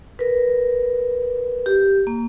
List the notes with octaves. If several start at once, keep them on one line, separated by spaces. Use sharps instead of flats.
A#4 B4
G4
A#3